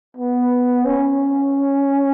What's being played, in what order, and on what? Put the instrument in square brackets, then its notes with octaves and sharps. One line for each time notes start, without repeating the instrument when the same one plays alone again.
[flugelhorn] B3
C#4